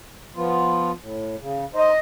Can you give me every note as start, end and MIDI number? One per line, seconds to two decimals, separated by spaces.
0.36 0.92 53
0.36 0.92 59
0.36 0.92 65
1.01 1.36 45
1.40 1.65 49
1.74 1.91 63
1.74 1.91 72
1.74 1.99 75